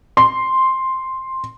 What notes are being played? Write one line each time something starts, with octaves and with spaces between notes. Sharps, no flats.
C6